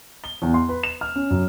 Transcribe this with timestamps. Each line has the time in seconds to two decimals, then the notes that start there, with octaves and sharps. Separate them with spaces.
0.24 G7
0.42 E2
0.54 C6
0.69 B4
0.83 E7
1.01 F6
1.16 C#4
1.31 F#2